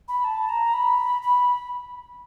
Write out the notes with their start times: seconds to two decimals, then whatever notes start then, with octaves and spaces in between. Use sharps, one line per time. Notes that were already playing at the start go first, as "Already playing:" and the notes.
0.08 B5
0.24 A5
0.49 A#5
0.74 B5
1.22 B5